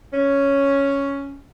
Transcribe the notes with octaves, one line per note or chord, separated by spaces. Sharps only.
C#4